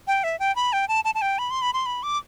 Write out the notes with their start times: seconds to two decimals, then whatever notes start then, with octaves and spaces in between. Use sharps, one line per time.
0.07 G5
0.24 E5
0.39 G5
0.56 B5
0.73 G5
0.88 A5
1.05 A5
1.15 A5
1.22 G5
1.39 B5
1.51 C6
1.62 B5
1.73 C6
1.86 B5
2.03 D6